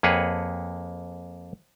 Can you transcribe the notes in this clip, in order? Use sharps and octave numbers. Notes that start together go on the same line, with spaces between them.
F2 A#3 G#4 B4 C#5 F#5